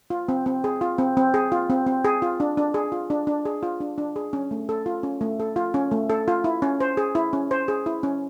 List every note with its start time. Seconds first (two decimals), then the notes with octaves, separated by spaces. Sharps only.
0.10 F4
0.29 C4
0.46 C4
0.64 G#4
0.81 F4
0.98 C4
1.17 C4
1.34 G#4
1.52 F4
1.70 C4
1.86 C4
2.05 G#4
2.22 F4
2.40 D4
2.57 D4
2.74 G#4
2.92 F4
3.10 D4
3.27 D4
3.45 G#4
3.63 F4
3.81 D4
3.98 D4
4.16 G#4
4.33 C#4
4.51 A3
4.69 A4
4.86 F4
5.03 C#4
5.21 A3
5.40 A4
5.56 F4
5.74 C#4
5.91 A3
6.10 A4
6.28 F4
6.44 E4
6.62 C#4
6.81 C5
6.97 G#4
7.15 E4
7.33 C#4
7.51 C5
7.68 G#4
7.86 E4
8.03 C#4